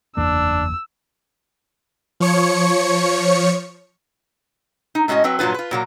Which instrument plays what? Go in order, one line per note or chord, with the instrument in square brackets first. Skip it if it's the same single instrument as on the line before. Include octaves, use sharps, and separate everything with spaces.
[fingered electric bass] F#1 E2 A#3 [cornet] D4 [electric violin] E6
[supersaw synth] F3 C#5 C#7
[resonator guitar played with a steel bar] D#4
A2 G#3 C#4 F#4 D#5
F#3 C4 B4
G2 A#2 F#3 F4 B4
F4 B4
A#2 F#3 A#3